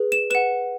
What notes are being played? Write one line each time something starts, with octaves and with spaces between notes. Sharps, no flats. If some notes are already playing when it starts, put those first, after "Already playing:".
Already playing: G#4 B4
E7
B4 F#5 E7